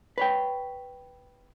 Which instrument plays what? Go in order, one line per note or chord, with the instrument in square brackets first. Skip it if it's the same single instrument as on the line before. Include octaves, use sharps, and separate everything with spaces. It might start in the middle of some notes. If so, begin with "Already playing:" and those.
[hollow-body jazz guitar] B4 C#5 G5